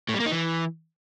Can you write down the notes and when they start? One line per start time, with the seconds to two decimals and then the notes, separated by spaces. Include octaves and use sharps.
0.09 A2
0.14 G3
0.20 A#3
0.26 D#4
0.31 E3